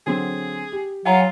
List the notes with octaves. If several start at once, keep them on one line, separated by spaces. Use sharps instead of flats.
D3 F#3 C4 G#4
G4
F#3 F4 F#5 G#5 A#5